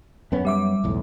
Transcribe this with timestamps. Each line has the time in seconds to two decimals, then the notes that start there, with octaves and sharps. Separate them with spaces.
0.32 F#2 B3 C#4
0.45 G3 E5 D6
0.84 B1 E2 A2